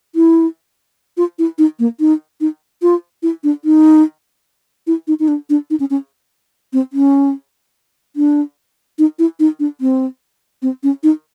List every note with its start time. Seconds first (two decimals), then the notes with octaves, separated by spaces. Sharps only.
0.15 E4
1.17 F4
1.39 E4
1.58 D#4
1.79 A#3
2.00 D#4
2.41 D#4
2.82 F4
3.23 E4
3.44 D4
3.65 D#4
4.87 E4
5.08 D#4
5.20 D#4
5.28 D4
5.50 D4
5.70 D#4
5.80 C#4
5.90 C#4
6.73 C4
6.93 C#4
8.16 D4
8.99 D#4
9.19 E4
9.40 D#4
9.60 D4
9.81 C4
10.62 C4
10.83 C#4
11.03 D#4